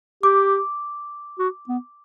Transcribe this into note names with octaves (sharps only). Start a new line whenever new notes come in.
G4 D6
F#4
B3